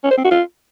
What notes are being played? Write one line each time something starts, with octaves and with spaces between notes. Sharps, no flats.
C#4
C5
C4
F#4
F4